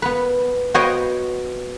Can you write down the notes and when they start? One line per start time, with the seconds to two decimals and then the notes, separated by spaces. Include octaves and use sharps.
0.02 B3 B4
0.74 B3 F#4 C5 C#5 D#5 G5